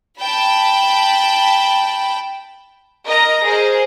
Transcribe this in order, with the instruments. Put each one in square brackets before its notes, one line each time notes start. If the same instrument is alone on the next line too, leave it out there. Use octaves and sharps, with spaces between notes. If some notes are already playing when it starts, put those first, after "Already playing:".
[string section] G5 A5 B5
[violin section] A#4 D#5 A#5 A#6
G#4 A#4 C5